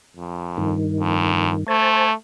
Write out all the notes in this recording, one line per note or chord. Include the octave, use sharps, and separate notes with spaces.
F2
G2 D#3
F2
A3 C5 G#5 A5